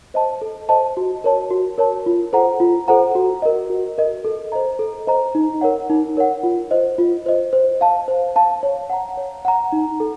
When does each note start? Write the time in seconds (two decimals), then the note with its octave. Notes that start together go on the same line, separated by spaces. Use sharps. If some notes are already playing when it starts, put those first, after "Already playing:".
0.14 C5 D#5 A5
0.42 A4
0.69 C5 D#5 A5
0.97 F#4
1.24 A#4 C#5 A5
1.50 F#4
1.78 A#4 C#5 A5
2.06 F4
2.33 A4 C5 F#5 A#5
2.60 F4
2.88 A4 C5 F#5 A#5
3.15 F#4
3.42 A#4 D#5
3.70 F#4
3.98 A#4 D#5
4.25 A4
4.52 C5 D#5 A#5
4.79 A4
5.07 C5 D#5 A#5
5.35 D#4
5.61 A#4 C#5 F#5
5.90 D#4
6.17 A#4 C#5 F#5
6.43 F4
6.71 C5 D#5
6.98 F4
7.26 C5 D#5
7.53 C5
7.81 F5 A5
8.08 C5
8.36 F5 A5
8.63 C#5
8.90 F#5 A#5
9.17 C#5
9.45 F#5 A#5
9.72 D#4
10.00 A4